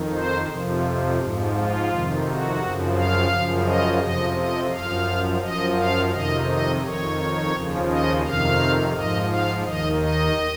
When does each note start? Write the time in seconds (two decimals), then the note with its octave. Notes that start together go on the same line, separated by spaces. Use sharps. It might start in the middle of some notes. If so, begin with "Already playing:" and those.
Already playing: F2 D#3
0.13 C5
0.49 F2 C3 F3
1.18 G#2 F3
1.54 F4
1.89 F2 C3 D#3
2.24 F#4
2.59 F#2 C#3 F3
2.95 F5
3.30 F#2 C#3 F3
3.65 D#5
4.00 F2 C3 F3 D#5
4.36 D#5
4.71 F#2 F3 F5
5.41 F#2 F3 D#5
5.76 F5
6.11 F2 C3 D#3 D#5
6.47 D#5
6.82 F2 D#3 C#5
7.52 D#2 C#3 F3
7.88 D#5
8.22 F2 C3 D#3 F5
8.93 G#2 F3 D#5
9.28 F5
9.63 D#2 D#3 D#5
9.99 D#5